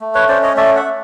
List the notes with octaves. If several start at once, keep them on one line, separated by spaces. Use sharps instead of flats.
A3
B4 C#5
C#4 C5 D5
C#5 D#5
A3 D5 E5
E5 F#5
A3